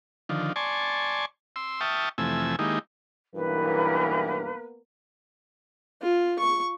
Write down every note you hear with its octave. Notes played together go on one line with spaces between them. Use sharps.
D3 D#3 F3
D5 G#5 A5 C6 C#6
C6 E6
E5 G5 A5 C#6 D#6 F6
F2 C3 E3 A3 G#5 E6
D#3 G#3 A#3 D#4 E4 G4
B1 G2 E3 A#3 B3 A#4 B4
F4
C#6